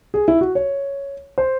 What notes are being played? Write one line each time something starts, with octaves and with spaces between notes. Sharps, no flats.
G#4
E4
F#4
C#5
C5